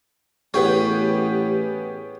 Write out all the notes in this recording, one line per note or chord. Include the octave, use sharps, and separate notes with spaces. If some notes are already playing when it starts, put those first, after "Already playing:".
A1 B3 C#4 G4 G#4